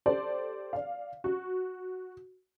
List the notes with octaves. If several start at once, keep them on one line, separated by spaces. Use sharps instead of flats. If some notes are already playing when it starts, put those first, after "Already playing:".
G4 A4 C5 D5
D5 F5
F#4